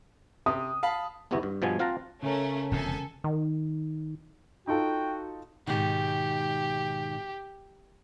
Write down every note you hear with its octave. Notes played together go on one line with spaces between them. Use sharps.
C3 D#6
F5 A5 B5
G1 E2 C3 B3 E4 F#4
G2
G2 B2 F3 B3 G#5
C4 F4 F5 F#5 A5 A#5
C#3 A3 C#4 A#4
E1 F2 C3 A4 G#5
D#3
D#4 F4 F#4 A4 G5
G#2 B2 D#3 G4